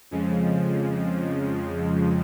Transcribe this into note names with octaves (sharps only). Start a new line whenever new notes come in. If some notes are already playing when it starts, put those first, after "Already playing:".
F2 C#3 F3 G#3